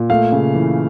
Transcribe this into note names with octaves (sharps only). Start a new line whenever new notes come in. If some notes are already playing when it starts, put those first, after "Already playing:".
Already playing: A#2
A3 F5
C#3
E3